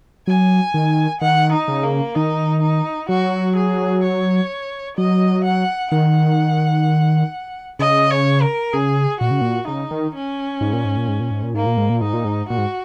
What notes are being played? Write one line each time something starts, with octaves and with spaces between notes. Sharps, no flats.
F#3 G#5
D#3
D#3 F#5
D#4
C#3
A#3
D#3 D#4
D#4
F#3 F#4
G#4
C#5
F#3 D#5
F#5
D#3 F#5
C#3 D#5
C#5
A#4
C#3 G#4
A#2 F#4
C#3
A#2
C#3 D#4
D#3
C#4
G#2
A#2
G#2
A#2
G#2
A#2
G#2
A#2
G#2 A#3
A#2
G#2
A#2
G#2 D#4
A#2
G#2
A#2 F#4
G#2